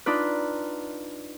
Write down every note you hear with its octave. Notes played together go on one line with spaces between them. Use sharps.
D4 D#4 F4 B4